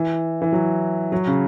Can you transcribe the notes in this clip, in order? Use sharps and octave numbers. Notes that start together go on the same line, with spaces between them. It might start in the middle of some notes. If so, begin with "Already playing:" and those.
Already playing: E3
E3
F#3
F#3
C#3